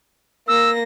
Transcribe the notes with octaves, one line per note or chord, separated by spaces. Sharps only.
A#3 E6 A#6